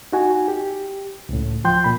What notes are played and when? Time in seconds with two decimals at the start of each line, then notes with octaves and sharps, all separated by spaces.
0.13 D#4 F#4 G#5
0.48 G4
1.29 C#2 A2
1.65 F3 G5 C6 G6
1.84 A#2 B5